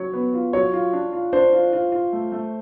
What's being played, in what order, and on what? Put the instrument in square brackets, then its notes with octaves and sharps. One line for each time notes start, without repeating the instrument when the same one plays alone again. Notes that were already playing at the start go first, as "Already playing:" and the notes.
Already playing: [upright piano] F#3 [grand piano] C#5
[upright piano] B3
F4
[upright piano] F#3 [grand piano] C#5
[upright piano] F4
D4
F4
[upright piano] D4 [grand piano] C5
[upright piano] F4
F4
F4
A3
A3